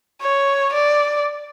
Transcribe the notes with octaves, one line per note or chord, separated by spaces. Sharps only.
C#5
D5